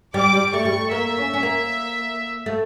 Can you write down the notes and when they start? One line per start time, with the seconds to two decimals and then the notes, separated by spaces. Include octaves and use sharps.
0.14 G3 D6
0.33 G3
0.53 A3 C#6
0.65 G3
0.72 A3
0.91 A#3 E5
1.17 C#4
1.34 C#4
1.43 A#3
2.46 A3